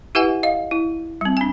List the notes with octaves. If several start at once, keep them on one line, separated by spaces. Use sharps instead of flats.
E4 G4 B4 E5 F#5 G#5
D#5 F5
E4
G3 C4
D4 G#5